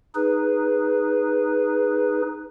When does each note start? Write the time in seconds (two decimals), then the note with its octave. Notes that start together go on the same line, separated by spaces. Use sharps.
0.15 D#4 G#4 B4